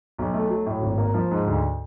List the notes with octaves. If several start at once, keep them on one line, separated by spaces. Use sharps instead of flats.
B1
A3
F#3
A2
G#1
A#3
F3
G#2
D2